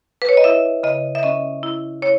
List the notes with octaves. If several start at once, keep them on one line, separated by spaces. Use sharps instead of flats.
B4
C#5
D#5
E4 E5
C#3 D#5
E5
C#4 D#5
E4
E4 C#5